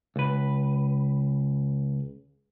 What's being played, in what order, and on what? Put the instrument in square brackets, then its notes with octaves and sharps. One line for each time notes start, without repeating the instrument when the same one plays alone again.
[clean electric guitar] C#2 B4